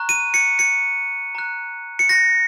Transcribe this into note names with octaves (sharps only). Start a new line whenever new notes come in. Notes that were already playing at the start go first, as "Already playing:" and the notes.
Already playing: A#5 C#6 F#6
D#7
C#7
C#7
A#5 F#6
C#7
A#6